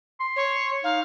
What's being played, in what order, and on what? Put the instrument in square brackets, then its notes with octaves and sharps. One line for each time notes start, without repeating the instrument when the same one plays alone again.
[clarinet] C6
[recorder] C#5
[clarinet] D#4 [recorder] F5